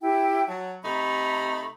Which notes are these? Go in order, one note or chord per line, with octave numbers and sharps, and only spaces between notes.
E4 G4 G5
F#3 A5
C3 A3 D#4 A#5 B5